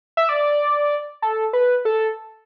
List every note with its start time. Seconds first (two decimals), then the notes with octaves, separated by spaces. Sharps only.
0.17 E5
0.29 D5
1.22 A4
1.53 B4
1.85 A4